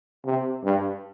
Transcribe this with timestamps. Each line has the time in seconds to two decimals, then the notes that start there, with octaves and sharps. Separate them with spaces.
0.25 C3
0.64 G2